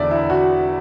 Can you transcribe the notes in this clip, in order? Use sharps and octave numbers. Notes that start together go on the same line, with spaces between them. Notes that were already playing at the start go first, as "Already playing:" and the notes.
Already playing: E1 E2 D3 D5 E5
E4
F#4